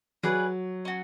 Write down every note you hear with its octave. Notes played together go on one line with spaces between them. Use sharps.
F#3 G#4 B4 D5
C#4 F#4